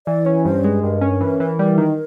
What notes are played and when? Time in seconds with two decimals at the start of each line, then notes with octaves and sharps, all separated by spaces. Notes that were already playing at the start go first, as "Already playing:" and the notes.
0.06 E3 D5
0.25 C#4 C#5
0.45 G2 C5
0.64 G#3 B4
0.83 G2 A#4
1.01 C#4
1.21 E3
1.40 E3
1.59 G3
1.78 D#3